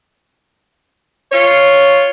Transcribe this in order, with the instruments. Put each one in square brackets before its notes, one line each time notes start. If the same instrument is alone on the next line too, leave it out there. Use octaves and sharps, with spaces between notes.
[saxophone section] F4 C#5